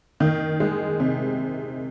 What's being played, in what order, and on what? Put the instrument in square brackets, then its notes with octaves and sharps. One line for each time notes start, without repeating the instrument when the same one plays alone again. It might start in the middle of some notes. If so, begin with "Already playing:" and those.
[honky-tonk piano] D#3
G#3
C3